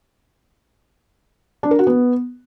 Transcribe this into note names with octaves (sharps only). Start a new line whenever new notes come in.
D4
A#4
F#4
B3